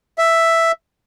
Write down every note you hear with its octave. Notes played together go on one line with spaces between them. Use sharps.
E5